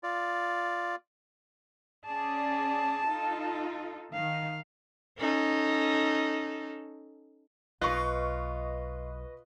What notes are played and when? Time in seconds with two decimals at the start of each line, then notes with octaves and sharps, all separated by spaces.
0.03 F4 D5
2.05 C#4 G#4 D5 A5
3.07 D#4 F4 A4
4.13 D#3 F5
5.18 C#4 D#4 A4
7.81 B1 F4 B4 D#5 C#6 F#6